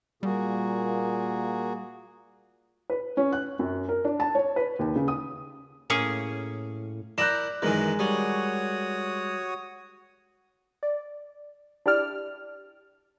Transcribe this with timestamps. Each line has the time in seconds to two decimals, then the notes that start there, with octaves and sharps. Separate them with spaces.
0.23 A#2 G3 A#3 F#4 G#4
2.90 B4
3.17 C#4
3.32 F#6
3.59 F#2
3.89 A#4
4.05 D4
4.20 A5
4.35 C#5
4.56 B4
4.79 D#2
4.96 C#3
5.08 D#6
5.90 A2 A#3 C#4 G#4
7.18 E4 A#4 D5 F#6 G6 E7
7.62 F#2 D#3 E3 G#3 A#4
7.99 G3 F#4 C#5 D#6
10.83 D5
11.86 D4 E4 G4 D5 F6